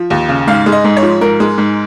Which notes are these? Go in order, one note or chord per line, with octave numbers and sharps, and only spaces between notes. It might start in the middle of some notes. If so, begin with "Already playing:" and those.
Already playing: F3
D#2
C#3
G#2 F5
G#3
D#5
G#2
C#5
F3
G#2 A#4
G#3
G#2